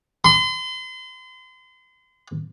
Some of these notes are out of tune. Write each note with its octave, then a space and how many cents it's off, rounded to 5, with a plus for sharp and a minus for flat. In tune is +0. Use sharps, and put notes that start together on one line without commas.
C6 -40